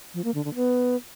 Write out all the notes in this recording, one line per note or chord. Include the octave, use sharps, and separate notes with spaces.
F3
A#3
D3
D3
B3